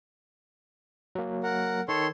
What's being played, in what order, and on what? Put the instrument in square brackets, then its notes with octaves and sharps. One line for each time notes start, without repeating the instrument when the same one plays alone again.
[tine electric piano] F#3 A#3
[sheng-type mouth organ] A#4 F#5
[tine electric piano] D#3 [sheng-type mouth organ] A4 C#5 C6